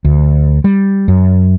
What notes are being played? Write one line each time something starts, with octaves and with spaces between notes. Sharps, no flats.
D2
G3
F#2